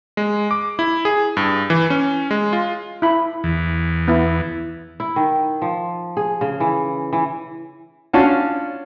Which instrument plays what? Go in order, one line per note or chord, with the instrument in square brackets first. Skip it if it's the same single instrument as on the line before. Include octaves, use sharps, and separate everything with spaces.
[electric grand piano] G#3
D6
E4
G#4
G2
E3
C#4
G#3
F4
[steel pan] E4 B5
[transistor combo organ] E2
[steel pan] B3 E4
[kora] E4
D#3
F3
G#4
C#3
E3
E3
[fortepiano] C#4 D4 F4 F#4 A5